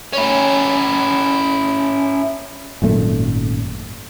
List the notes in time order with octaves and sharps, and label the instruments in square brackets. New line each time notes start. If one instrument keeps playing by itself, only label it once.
[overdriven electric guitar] C#4 E4
[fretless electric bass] G#1 F#2 A#2 A3